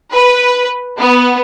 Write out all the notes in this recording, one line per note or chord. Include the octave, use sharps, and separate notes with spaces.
B4
B3